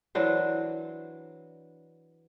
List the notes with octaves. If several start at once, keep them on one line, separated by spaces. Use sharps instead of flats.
E3 F#3 D4 C5